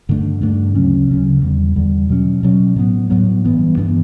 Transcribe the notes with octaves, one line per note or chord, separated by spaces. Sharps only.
G2 D3 A3 D4
G2 D3 A3 D4
D2 C#3 F#3 C#4
D2 C#3 F#3 C#4
E2 D3 G3
E2 D3 G3
B2 F#3 C#4
B2 F#3 C#4
A2 F#3 B3
A2 F#3 B3
G2 E3 B3 D4
G2 E3 B3 D4